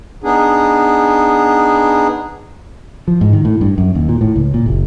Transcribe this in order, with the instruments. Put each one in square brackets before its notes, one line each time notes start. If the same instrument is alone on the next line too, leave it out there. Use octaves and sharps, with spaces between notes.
[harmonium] B3 D4 D#4 G#4
[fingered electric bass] F3
G#2
D#3
A2
G2
F#2
D#2
A#2
A2
C#2
A#2
F#1